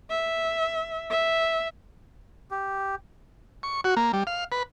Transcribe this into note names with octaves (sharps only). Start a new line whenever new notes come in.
E5
E5
G4
C#6
F#4
A#3
G3
F5
B4